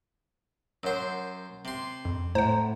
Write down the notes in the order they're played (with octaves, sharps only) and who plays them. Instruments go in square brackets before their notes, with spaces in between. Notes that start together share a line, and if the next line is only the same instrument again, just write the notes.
[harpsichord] F#2 C5 [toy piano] A#4 C#5 F#5
[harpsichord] C3 C6
[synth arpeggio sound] F2
[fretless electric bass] A2 [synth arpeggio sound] C5 F#5 [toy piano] A#5